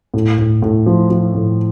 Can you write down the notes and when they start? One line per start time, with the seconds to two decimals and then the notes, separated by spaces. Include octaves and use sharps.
0.14 A2
0.38 A2
0.62 A2
0.86 F3
1.10 F3
1.34 A2